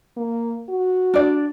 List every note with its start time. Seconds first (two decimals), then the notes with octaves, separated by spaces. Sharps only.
0.17 A#3
0.69 F#4
1.14 D4 D5